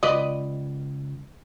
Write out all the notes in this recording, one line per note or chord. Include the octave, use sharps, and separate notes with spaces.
C#2 B4 D5 D#5